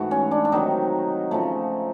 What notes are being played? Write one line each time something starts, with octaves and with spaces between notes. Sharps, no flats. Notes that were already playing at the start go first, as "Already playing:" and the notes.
Already playing: G#2 E3 A3 F#4
C#4
D4
D4
C3 D#3 F#3 D#4
C#3 F3 A3